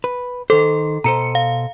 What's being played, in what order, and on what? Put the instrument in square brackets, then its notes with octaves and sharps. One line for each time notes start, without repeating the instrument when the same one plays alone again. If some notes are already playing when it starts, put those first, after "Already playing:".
[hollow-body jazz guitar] B4
[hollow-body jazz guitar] D#3 C5 [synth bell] A4
[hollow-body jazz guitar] B2 A4 C5 [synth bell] A#5 C#7
[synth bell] F5